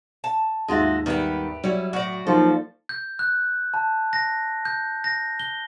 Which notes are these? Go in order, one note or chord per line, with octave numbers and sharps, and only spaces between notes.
A5
D#2 G#2 G#3 F4 F#4 E5
D#3 G3 B3 G4 A#4 B4
F#3 G3 C#4 E4
A2 F#4 D5
F3 F#3 A#3 D#4 A4
G6
F#6
A5
A#6
G6
A#6
G7